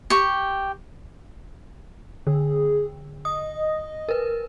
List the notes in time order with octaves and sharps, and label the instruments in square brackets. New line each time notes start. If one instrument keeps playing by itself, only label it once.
[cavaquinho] G4 C#6
[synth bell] D3 [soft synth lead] G#4
[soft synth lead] D#5 [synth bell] D#6
[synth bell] A#4 B4